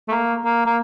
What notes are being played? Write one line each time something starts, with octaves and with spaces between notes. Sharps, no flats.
A3
A#3
A#3
A#3